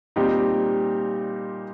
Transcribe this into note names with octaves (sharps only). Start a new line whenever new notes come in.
A#2 G3 C4 D#4 G4